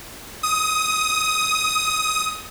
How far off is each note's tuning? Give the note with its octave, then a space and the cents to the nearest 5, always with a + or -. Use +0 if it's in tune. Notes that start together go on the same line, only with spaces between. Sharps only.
D#6 +15